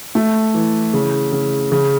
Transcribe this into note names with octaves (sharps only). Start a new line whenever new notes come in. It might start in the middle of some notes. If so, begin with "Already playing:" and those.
A3
E3
C#3
C#3
C#3